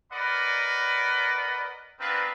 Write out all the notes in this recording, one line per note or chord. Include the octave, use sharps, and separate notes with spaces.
A#4 B4 D5 D#5 F#5 B5
B3 C4 D4 F4 A#4 B4